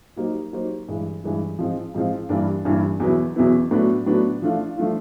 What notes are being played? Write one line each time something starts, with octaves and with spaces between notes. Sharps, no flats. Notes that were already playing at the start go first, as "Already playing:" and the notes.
F#3 A#3 D#4 G4 C5
F#3 A#3 D#4 G4 C5
G2 E3 G#3
G2 E3 G#3
G#2 F3 G#3 C4 F4
G#2 F3 G#3 C4 F4
G2 E3 G3 A#3 D4
G2 E3 G3 A#3 D4
E2 B2 F#3 B3 E4
E2 B2 F#3 B3 E4
A2 F#3 B3 D4 F#4
A2 F#3 B3 D4 F#4
F3 A3 D4 F4
F3 A3 D4 F4